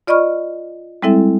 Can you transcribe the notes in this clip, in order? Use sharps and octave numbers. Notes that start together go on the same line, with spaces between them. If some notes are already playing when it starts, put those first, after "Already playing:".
F4 D5 D#5 B5 C#6 F6
G3 G#3 C4 E4 A4 E5